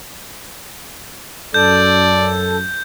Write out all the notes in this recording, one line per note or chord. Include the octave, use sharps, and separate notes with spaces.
F#2 A4 D5 G6